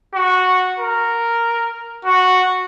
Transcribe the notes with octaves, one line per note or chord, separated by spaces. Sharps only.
F#4
A#4
F#4